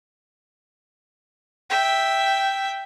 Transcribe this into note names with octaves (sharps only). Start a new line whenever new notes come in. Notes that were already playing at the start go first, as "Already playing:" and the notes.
E5 G5